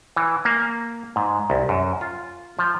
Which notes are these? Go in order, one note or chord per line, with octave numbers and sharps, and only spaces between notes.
E3
A#3
G#2
C2
F#2
F4
F3